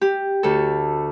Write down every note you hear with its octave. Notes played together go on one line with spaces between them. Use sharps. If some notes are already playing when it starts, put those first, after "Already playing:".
G4
D2 A4